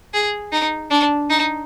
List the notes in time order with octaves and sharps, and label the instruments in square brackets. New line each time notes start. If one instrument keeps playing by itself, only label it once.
[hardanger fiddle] G#4
D#4
D4
D#4